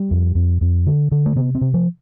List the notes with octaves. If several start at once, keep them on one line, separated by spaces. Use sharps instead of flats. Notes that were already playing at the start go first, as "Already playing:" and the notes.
Already playing: G3
F2
F2
F2
D3
D3
A3
C3 B3
C4
C3
F3